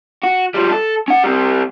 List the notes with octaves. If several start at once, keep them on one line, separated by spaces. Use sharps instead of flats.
F#4
F3 G3
A4
C#4 F#5
G3 C4